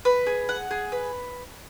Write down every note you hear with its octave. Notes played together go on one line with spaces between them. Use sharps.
B4
G#4
F#5
G#4
B4